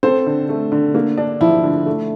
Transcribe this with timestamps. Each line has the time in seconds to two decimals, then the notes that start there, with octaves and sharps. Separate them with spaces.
0.03 C4 A4 C5
0.26 D3
0.49 A3
0.72 D3
0.95 A#3
1.18 D4
1.41 F3 E4
1.64 D3
1.86 A3